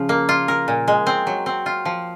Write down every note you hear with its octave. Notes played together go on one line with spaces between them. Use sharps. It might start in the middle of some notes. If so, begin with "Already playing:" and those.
Already playing: C#3 F3
A#3
F4
A#4
A#2
G#3
C4
F#3
C4
F4
F3